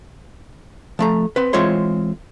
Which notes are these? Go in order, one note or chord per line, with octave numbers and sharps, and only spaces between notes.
F3 A3 A#5
C4 B4
E3 G#3 C4 F4 C#5 C6